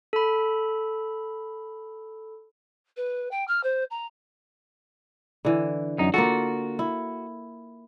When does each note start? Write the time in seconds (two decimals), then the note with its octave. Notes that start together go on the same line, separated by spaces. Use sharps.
0.13 A4 B5
2.97 B4
3.31 G5
3.47 F6
3.63 C5
3.90 A#5
5.45 D3 E3
5.99 F#2 D#4
6.14 A#3 F4 F#4 A4
6.79 E4